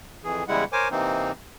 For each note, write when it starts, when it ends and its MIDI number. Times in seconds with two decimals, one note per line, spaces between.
0.24 0.44 41
0.24 0.44 52
0.24 0.44 68
0.48 0.64 40
0.48 0.64 49
0.48 0.64 55
0.48 0.64 56
0.48 0.64 64
0.48 0.64 78
0.72 0.88 70
0.72 0.88 72
0.72 0.88 73
0.72 0.88 80
0.72 0.88 86
0.91 1.32 48
0.91 1.32 52
0.91 1.32 58
0.91 1.32 60
0.91 1.32 63